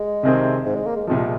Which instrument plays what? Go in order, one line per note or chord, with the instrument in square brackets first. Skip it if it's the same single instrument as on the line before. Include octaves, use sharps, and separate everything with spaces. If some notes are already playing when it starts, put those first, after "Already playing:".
Already playing: [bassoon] G#3
[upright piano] C2 C3 D#3 C4 G#4
[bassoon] G#2
G#3
A#3
G#3
[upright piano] C2 A#2 F3 [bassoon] G#3